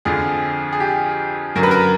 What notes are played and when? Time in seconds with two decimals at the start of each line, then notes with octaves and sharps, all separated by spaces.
0.05 F2 D3 F3 G#4
0.73 G#4
0.80 G4
1.55 F#2 D3 F#3 A#4
1.63 B4
1.71 A#4